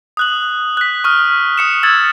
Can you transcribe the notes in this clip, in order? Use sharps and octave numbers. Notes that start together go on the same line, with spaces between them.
D#6 F#6 F#7
F#6 B6
C#6 D#6 F6
D#6 C#7 E7
E6 G#6 A6